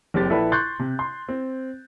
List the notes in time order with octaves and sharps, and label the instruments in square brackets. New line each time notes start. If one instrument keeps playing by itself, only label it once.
[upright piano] F#1 C4 G4 A6
A#1 E4 A4 B4 B5
C6 C#6 F#6 G6 A6
C3
C6
C4